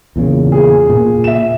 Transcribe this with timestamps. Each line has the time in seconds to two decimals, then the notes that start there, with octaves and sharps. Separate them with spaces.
0.16 E2 A#2 C#3
0.52 G#4
0.89 A#2
1.24 E5 E7